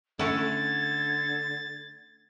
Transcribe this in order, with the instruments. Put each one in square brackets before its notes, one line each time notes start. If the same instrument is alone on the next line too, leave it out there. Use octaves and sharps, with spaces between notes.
[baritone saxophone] D3 [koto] A3 C#4 E4 [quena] G#6 [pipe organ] A6